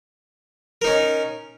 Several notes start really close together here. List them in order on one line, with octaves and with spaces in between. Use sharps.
A#4 D#4 C#4